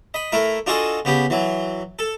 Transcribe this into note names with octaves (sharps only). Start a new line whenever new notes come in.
D#5 B5
A3 E4 A#4
D4 F4 F#4 G#4 A4 D#5
C#3 B3 G4
E3 F#3
A4